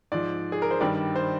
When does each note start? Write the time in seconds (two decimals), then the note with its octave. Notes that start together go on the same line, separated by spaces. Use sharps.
0.12 G#2 F3 D5
0.52 G#4
0.62 A#4
0.71 C5
0.81 G2 D#3 G3 D5
1.16 C5